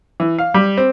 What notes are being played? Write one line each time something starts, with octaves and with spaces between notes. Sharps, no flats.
E3
F5
G3
C4